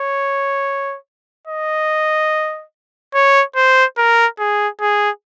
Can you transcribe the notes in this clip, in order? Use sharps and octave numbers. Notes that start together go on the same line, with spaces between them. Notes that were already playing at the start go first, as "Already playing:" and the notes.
Already playing: C#5
D#5
C#5
C5
A#4
G#4
G#4